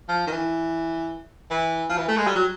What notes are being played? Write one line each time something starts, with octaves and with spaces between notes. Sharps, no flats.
F3
D#3
E3
E3
F3
E3
A3
G#3
G3
F#3